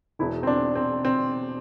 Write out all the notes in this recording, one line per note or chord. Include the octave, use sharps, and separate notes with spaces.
E1 E2 B2 E4
C4
D4
C4
C4